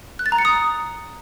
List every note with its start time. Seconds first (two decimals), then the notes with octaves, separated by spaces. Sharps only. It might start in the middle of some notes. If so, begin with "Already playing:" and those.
0.19 F#6
0.26 A6
0.32 A#5
0.39 C#7
0.45 D#6